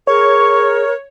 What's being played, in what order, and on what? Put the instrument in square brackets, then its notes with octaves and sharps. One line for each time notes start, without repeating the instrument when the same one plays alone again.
[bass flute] G#4 [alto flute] A#4 [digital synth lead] C#5 [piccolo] C#6